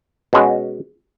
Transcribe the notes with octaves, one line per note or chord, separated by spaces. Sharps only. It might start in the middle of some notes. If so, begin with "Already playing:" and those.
B2 G#3 C#4 F#4